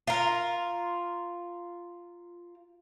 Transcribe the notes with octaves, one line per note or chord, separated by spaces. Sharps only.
F4 A#4